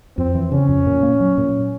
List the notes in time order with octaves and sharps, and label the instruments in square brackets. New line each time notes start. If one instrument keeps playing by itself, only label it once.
[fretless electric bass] F2 [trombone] C4
[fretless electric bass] E3
[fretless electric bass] C#3 [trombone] C#4
[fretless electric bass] F2
A#2
A#3
F#3
A#2